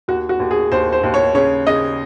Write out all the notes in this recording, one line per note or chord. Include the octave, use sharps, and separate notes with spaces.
D#2 F#4
F#4
D#2
G#4
D#2 C5
C5
D#2
C#5
C#3 C#5
C#3 D#5